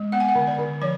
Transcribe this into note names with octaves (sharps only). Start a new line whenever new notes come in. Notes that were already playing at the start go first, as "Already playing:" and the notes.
Already playing: G#3
B3 F#5
G#5
F#5
D3
D5
D3
F3 C#5